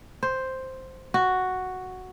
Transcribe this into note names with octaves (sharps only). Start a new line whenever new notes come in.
C5
F#4